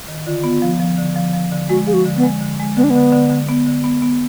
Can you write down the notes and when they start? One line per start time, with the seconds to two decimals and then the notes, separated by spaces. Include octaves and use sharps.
0.08 D#3
0.26 D3 F4
0.44 B3
0.62 F3
0.80 F3
0.98 D3
1.16 F3
1.34 F3
1.51 D3
1.69 G#3 F#4
1.87 F3 G#4
1.93 F#4
2.06 D3
2.17 B3
2.23 G#3
2.41 D3
2.59 G#3
2.76 D3 B3
2.84 D4
2.91 D3 B3
3.12 D3
3.30 D3
3.49 B3
3.67 D3
3.84 B3
4.02 B3